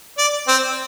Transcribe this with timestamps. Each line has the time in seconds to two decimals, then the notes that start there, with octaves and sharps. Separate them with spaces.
0.18 D5
0.48 C4